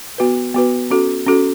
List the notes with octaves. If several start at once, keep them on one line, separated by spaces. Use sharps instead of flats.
B3 F#4 B4
B3 F#4 B4
C#4 F#4 A4
C#4 F#4 A4